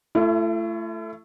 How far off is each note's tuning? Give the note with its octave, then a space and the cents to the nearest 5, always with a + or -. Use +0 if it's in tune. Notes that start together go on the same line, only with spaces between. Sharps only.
A3 +5 E4 +45